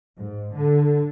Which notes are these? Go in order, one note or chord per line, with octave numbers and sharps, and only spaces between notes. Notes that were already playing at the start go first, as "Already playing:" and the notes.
G#2
D3